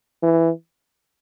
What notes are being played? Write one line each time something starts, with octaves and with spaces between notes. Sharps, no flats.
E3